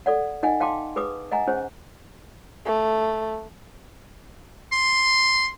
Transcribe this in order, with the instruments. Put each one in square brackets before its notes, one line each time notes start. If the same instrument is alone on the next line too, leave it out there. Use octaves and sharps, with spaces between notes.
[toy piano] A4 D5 F#5
D#4 D#5 F#5 G#5
F5 G5 A5 C6 D6
G#4 B4 D6 D#6
D#5 F#5 G#5 A#5
C#4 G#4 C5
[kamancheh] A3
[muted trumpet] C6